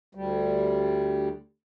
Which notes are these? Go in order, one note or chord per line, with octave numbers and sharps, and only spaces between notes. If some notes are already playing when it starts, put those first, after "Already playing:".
D2 G3